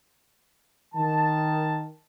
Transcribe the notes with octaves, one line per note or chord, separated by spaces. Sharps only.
D#3 A5